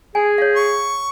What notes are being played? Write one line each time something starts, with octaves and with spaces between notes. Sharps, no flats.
G#4 G#5
C#5 F5
C#6